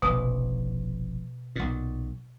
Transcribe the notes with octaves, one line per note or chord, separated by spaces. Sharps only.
F1 A#1 B2
B1 A#2